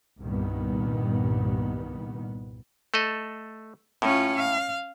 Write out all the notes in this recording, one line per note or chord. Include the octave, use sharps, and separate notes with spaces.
C2 G2 A#2 D#3 B3
A3 A4 D#5
A2 C#4 F4
F5